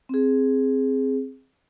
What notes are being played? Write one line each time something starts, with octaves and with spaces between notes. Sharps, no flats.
C4 G#4